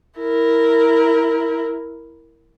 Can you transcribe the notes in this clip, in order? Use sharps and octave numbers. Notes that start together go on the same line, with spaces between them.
E4 A#4